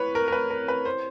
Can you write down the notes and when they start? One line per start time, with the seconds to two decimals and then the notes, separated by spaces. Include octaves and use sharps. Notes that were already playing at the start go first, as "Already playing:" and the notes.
Already playing: C4 E4 B4 C#5
0.15 A#4
0.28 A#4
0.32 B4
0.50 A#4
0.68 B4
0.85 C5